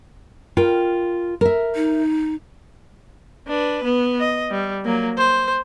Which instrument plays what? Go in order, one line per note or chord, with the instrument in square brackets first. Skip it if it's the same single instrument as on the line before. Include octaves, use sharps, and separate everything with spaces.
[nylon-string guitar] F4 A#4 G5
A#4 E5
[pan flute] D#4
[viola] D4 B4
B3
D#5
G3
F#3 A#3
C5